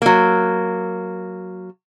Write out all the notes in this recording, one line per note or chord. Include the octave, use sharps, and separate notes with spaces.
F#3 A#3